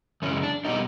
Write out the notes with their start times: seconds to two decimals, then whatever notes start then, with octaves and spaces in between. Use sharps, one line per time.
0.22 F#2 C#3 E3 G#3 C#4
0.43 D4
0.65 B2 G3 D#4